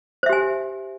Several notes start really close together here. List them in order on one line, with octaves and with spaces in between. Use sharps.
C5 E5 G4 G#5